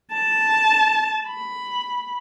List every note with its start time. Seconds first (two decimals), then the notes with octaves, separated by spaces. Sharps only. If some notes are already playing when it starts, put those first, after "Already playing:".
0.12 A5
1.27 B5